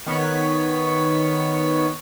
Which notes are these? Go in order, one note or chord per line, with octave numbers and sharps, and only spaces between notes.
D#3 B3 C#5 B6